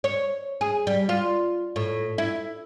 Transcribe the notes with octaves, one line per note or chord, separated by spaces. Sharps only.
C#5
G#4
G3
F4
A2
E4